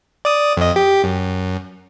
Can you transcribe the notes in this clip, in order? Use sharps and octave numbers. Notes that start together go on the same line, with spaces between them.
D5 D#6
F2 D#5
G4
F#2